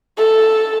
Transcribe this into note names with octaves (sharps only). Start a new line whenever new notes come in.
A4